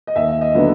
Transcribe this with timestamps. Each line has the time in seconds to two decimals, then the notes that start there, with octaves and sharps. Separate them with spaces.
0.07 D#5
0.15 D#2 E5
0.41 D#5
0.55 D3 F#3 B3